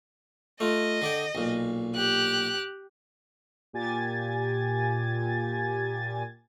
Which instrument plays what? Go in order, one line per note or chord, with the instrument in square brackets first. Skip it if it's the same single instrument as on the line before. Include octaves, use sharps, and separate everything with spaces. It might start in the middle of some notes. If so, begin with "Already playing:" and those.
[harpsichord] A3 F4 [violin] D#5
[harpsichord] D3 D5 G5
B1 A#2
[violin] G4 F#6
[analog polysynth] A#2 G4 G#5 G#6 A6